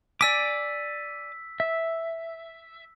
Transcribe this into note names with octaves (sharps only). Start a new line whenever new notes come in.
D5 G#5 D6 E6 B6
E5